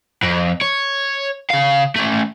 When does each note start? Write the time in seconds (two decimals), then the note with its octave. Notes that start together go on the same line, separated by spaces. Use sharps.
0.23 F2
0.62 C#5
1.51 C#3 F5
1.96 A3 C#4